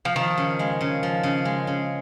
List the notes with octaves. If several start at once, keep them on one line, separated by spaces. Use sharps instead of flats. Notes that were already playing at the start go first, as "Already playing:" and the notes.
F3
D#3 F3
C#3
G#3
C#3
F3
C#3
G#3
C#3